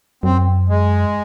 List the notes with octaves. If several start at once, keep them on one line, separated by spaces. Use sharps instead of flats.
F#2 C4
G#3